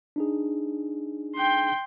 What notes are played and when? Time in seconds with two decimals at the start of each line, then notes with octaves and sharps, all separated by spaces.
0.16 D4 D#4 G#4
1.36 G5 C6